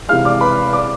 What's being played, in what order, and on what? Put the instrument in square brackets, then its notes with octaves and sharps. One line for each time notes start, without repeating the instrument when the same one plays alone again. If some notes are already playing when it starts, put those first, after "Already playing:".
[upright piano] C3 E3 G#3 [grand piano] F5 F6
[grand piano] D5 D6
B4 B5
D5 D6